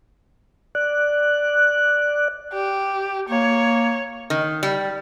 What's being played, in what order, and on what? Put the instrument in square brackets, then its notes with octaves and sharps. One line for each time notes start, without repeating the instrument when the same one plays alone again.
[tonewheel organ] D5 F#6
[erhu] G4
[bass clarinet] A#3 [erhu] C#5
[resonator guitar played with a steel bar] D#3
G3